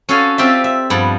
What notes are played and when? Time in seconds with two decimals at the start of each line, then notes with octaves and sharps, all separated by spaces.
0.09 C#4 F#4 A4 F5 G#5
0.38 C4 F4 G4 D5 E5
0.64 E5
0.90 G2 F3 B3